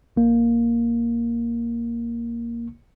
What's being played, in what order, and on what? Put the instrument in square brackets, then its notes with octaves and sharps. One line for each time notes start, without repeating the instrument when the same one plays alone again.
[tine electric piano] A#1 A#3